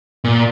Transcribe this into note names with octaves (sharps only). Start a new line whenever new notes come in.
A#2